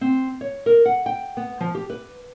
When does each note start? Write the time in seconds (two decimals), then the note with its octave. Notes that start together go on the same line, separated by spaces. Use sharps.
0.01 C4
0.41 C#5
0.66 A#4
0.85 F#5
1.06 G5
1.37 B3
1.61 F3
1.75 G4
1.90 B4